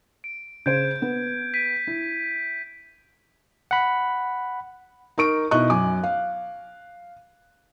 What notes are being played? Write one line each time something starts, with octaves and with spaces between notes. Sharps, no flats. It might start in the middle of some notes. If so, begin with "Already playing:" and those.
D7
C#3 C5 G6 G#6 D7
B3
B6 D7 D#7
E4
F#5 B5
D#4 A#4 C#6 D7
B2 D#4 E4 D#5 C#6 F#6
F#2 G#5 D6
F5